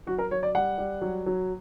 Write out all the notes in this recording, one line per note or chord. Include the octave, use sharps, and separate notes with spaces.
F#3 F#4
A#4
F#3 C#5
D5
G3 F#5
G3
F#3
F#3